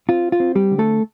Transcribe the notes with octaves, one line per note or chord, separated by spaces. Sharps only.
C4 F4
F4
C4
G3 G4
D3
A3 A4